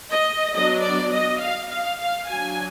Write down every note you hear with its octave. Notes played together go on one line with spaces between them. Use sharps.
D#5
F#3 B3 D4 D#5
D5
D#5
F5
F5
F5
F#3 D4 G#5